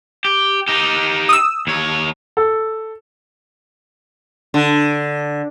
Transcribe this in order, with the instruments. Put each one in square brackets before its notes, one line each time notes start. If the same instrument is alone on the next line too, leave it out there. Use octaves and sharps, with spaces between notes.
[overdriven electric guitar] G4
D#4 G4
[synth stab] D#6 E6
[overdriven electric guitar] D#2 C#5
[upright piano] A4
[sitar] D3